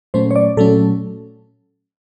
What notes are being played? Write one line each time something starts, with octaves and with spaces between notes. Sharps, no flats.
A#2 F#3 A3 C#4 C5
C#5
D5
A#2 F#3 A3 C#4 A4